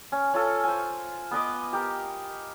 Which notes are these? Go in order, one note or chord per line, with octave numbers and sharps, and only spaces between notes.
C#4
C#4 F4 A4
C5 G#5
B3 B4 D#5 D6
G4 A#4